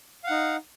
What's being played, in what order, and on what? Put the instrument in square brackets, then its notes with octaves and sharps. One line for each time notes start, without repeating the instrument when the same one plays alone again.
[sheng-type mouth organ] F5
F#5
D#4